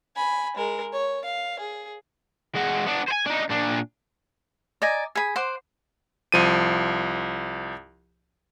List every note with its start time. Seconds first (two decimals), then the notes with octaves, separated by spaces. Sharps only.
0.16 G#5 B5
0.57 G#3 A#4
0.93 C#5
1.25 F5
1.59 G#4
2.55 G#3 F#4
2.86 B3 D4
3.08 C5 G#5
3.27 D4 D#4
3.50 A#2 D4
4.82 D5 D#5 G#5 A#5
5.15 G#4 B5
5.36 C5 F#5 C6 D6
6.32 C2 F3 D#7